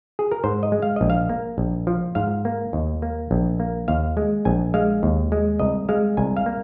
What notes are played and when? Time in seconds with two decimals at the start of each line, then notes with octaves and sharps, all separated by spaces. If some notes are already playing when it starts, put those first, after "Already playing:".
0.19 G#4
0.32 A#4
0.44 G#2 C5
0.63 D#5
0.72 G#3
0.82 F5
0.96 A#1 D#5
1.10 F5
1.29 A#3
1.58 A#1
1.87 F3
2.15 G#2 F5
2.45 A#3
2.73 D#2
3.02 A#3
3.31 A#1
3.60 A#3
3.88 D#2 F5
4.17 G#3
4.45 A#1 G#5
4.74 G#3 F5
5.03 D#2
5.32 G#3
5.59 C2 D#5
5.89 G#3 F5
6.17 C2 G#5
6.37 F5
6.46 A#3